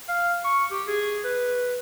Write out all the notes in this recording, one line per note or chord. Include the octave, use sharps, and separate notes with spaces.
F5
C#6
G4
G#4
B4